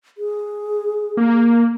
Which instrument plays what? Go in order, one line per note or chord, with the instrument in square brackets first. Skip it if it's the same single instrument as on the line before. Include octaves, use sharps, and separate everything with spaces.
[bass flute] G#4
[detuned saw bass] A#3